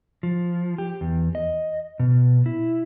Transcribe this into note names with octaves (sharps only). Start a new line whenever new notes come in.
F3
G4
E2
D#5
B2
E4